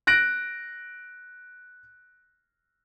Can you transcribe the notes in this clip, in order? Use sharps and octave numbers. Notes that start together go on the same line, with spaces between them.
F#6 A#6 D7